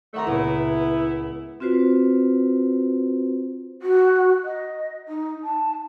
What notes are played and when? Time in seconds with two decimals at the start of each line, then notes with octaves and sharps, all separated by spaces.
0.14 C3 D#3 A3 E5 F#5 A#5
0.27 C#2 A#2 C#3 B3 E4
1.60 C4 F4 F#4 B4 C5
3.82 F#4
4.44 D#5
5.08 D#4
5.44 A5